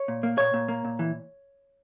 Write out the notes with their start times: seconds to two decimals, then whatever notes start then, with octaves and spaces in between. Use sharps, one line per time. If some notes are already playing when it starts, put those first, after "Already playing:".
Already playing: C#5
0.08 A#2
0.23 A#3
0.38 A#2 C#5
0.54 A#2
0.68 A#3
0.85 A#2
0.99 E3